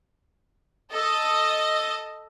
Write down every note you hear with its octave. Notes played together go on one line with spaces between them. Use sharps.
A4 D#5